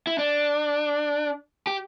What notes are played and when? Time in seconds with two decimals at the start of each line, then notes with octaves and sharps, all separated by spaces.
0.07 E4
0.18 D4
1.67 G4